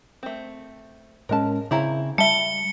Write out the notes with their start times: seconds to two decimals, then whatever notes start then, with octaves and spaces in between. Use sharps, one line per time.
0.23 A3 C4
1.29 A2 G#3 C#4 A#4 A5
1.71 C#3 C4 E4 A#5
2.18 G3 E5 A5 C#7 G7